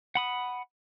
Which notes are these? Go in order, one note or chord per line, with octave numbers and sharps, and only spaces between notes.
F#5 B5 D#6